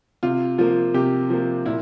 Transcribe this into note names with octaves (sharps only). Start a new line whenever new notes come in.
C3 F4
F3 A#3 F4
C3 G4
F3 A#3
A#2 E4